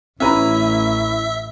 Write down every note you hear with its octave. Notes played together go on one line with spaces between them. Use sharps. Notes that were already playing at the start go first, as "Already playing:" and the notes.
A1 C#4 E4 B4 E5 A#5